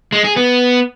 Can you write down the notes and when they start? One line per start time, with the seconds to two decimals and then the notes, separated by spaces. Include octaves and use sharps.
0.12 G#3
0.24 G#4
0.36 B3